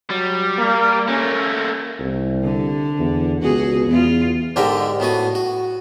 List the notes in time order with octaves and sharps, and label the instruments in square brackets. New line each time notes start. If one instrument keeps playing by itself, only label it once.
[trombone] F#3 [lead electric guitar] G3
[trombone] A#3
[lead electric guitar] A3 A#3 [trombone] C#4
[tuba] C2
[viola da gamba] D3
[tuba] E2
[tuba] C#2 [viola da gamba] B2 F#4 G#4
[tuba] E2 [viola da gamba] B3 F4
[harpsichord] G#2 D3 D4 G4 A#4 E5
A2 B3 F#4 G#5
F#4